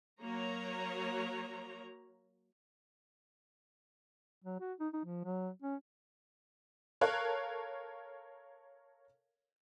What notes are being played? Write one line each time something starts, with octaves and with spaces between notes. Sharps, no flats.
F#3 A#3 C#5 A#5
F#3
F#4
D#4
D#4
F3
F#3
C#4
A4 A#4 C#5 F5 F#6